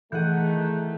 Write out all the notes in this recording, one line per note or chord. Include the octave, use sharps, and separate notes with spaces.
D#3 E3 A3 G#4 F#5 F#6 G6